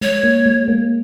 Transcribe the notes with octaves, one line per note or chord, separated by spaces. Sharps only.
G#3 C#5
A#3
G#3
A#3